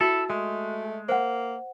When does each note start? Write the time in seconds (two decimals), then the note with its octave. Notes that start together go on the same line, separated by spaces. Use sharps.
0.01 E4 F#4 A4
0.30 G#3 A3
1.08 A#3 C5 F#5